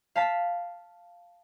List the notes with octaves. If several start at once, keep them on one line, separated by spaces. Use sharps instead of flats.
F5 A5 B6